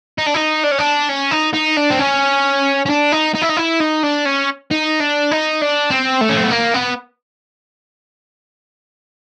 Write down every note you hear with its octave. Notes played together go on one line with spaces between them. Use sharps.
D#4
D4
D#4
D4
C#4
D4
C#4
D#4
D#4
D4
C4
C#4
C#4
D4
D#4
D#4
E4
D#4
E4
D#4
D4
C#4
D#4
D4
D#4
D4
C4
A3
C#4
C4
B3
A#3
B3